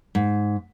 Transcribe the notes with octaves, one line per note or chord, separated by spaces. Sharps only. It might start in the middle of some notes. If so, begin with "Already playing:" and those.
G#2